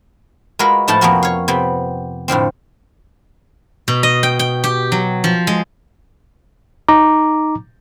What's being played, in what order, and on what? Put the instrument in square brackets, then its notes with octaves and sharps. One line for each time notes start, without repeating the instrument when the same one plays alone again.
[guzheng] G#3 F4 F#4 A#4 B4 F5
A2 F3 A3 E4 A4 A5
F2 C3 A#3 B3 F#4 A#4
C#5 F5
C3 B3 C4
A2 D3 F3 C4
B2
D#5
G5
G5
G4
F#3
F3
G#3
[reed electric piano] D#4 A#5 D6